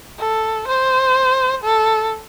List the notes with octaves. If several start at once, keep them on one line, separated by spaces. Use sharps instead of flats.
A4
C5
A4